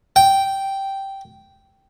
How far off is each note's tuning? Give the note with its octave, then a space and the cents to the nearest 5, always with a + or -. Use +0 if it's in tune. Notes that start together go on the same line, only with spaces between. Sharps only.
G5 -5